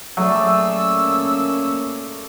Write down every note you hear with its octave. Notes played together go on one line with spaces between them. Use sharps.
F#3 A3 A#3 C#4 G#4 D5 E6